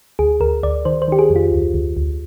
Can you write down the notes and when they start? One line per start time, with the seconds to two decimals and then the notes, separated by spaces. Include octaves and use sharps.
0.19 D2 G#4
0.40 D2 A#4
0.63 D2 D5
0.85 D#3 C5
1.02 C5
1.08 D#3 G4
1.19 G#4
1.30 F2
1.36 F4
1.52 D2
1.74 D2
1.97 D2